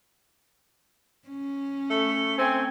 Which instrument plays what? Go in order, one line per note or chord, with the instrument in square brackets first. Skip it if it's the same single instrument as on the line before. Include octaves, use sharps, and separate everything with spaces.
[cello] C#4
[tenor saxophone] A3
[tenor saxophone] A3 [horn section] C4 G#5